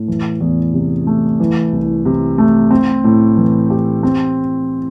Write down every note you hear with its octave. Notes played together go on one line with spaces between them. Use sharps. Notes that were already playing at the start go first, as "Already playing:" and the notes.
Already playing: A2
E3
E2
C3
A3
E3
C2
C3
A3
C4
A2
E3
G4
C4